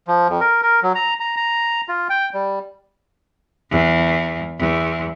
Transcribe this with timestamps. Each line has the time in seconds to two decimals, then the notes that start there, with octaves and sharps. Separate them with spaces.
0.08 F3
0.29 F2
0.41 A#4
0.62 A#4
0.83 F#3
0.95 A#5
1.20 A#5
1.37 A#5
1.88 F4
2.10 G5
2.34 G3
3.71 E2
4.59 E2